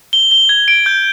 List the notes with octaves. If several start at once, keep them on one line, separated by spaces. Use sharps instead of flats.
G7
G7
G#6
D7
G6